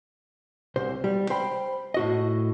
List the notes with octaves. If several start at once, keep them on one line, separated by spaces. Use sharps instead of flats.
C2 C5
G3
C5 G5 B5
A2 F#4 D#5